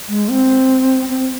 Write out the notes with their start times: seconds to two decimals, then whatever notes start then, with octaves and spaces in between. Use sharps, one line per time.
0.09 G#3
0.29 C4
1.09 C4